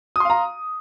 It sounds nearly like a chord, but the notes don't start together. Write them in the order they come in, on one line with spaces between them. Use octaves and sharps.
D#6 C6 F5 A#5